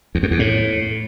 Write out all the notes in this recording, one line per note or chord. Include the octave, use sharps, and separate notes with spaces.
E2
F#2
E2
A2